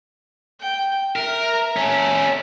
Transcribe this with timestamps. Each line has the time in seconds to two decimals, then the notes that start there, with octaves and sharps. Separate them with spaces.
0.61 G5
1.16 A#4 E5 A#5
1.76 C#4 A4